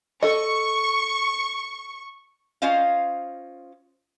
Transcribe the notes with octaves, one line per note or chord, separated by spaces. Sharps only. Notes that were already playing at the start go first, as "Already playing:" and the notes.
A4 D#5 C#6
C#4 F4 C5 D#5 F5